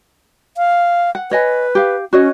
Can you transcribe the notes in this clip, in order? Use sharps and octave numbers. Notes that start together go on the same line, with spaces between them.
F5
F#5
B4 C#5 D#5 G#5
G4 F5
C#4 F#4 C#5 D#5